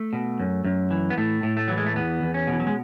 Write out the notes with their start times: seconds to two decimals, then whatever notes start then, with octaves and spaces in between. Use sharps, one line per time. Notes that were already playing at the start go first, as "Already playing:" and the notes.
Already playing: A3
0.13 B2
0.40 F#2
0.64 F#2
0.91 E3
1.10 B3
1.18 A2 A3
1.43 A2
1.57 A3
1.68 E3 F#3
1.77 G#3
1.86 A3
1.96 E2 B3
2.22 E2
2.34 C#4
2.47 B2
2.53 E3
2.60 F#3
2.67 G#3